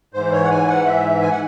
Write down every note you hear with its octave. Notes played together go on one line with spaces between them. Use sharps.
G#2 E3 C5
C#5
F#5
G#5
F#5
E5
G#5
F#5